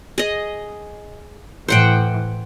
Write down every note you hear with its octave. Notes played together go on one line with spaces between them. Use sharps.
G#4 D#5
A2 E3 C5 F#5 G5